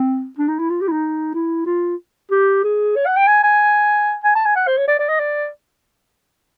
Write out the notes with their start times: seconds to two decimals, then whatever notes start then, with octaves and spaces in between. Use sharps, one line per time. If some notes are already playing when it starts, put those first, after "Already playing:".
Already playing: C4
0.38 D4
0.48 D#4
0.59 E4
0.70 F4
0.81 G4
0.88 E4
0.92 D#4
1.34 E4
1.66 F4
2.31 G4
2.64 G#4
2.96 C#5
3.06 F#5
3.16 G5
3.27 G#5
3.43 G#5
4.24 G#5
4.35 A5
4.45 G#5
4.56 F#5
4.67 C5
4.77 C#5
4.88 D5
4.99 D5
5.09 D#5
5.20 D5